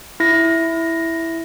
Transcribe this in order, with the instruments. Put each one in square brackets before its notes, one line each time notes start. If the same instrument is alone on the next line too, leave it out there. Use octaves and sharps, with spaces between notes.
[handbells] E4 A#6